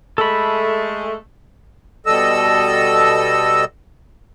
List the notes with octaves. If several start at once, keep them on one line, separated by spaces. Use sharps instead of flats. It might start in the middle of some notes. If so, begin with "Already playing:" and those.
G#3 A3 A4 B5
B2 G3 A4 D#5 E6